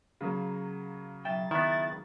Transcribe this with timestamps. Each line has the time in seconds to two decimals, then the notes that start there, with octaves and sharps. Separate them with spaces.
0.21 C#3 F#3 A#3
1.25 B1 E5 G5 A6
1.51 D#3 B3 E4